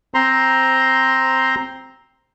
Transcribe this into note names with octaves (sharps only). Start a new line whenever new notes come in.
C4 C5 A#5 C6